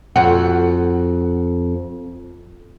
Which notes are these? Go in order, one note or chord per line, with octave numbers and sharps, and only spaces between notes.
F2 F#4